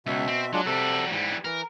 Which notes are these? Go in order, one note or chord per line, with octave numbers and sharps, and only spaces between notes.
C#2 B2 E5
C4
F#3 G#3 D4 F4
C3 G3 F#4 A4
G#2 E3 G3
E3 A#4